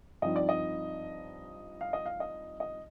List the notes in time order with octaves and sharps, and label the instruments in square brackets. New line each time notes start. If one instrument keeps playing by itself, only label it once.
[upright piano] G2 F3 C4 D#4 D#5
D5
D#5
F5
D#5
F5
D#5
D#5